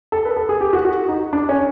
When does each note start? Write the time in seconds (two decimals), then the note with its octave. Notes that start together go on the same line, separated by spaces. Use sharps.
0.12 A4
0.25 B4
0.36 A4
0.49 G#4
0.61 G4
0.73 F#4
0.85 F#4
1.09 D#4
1.33 D4
1.49 C#4